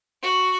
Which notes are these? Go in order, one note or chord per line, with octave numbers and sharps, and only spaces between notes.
F#4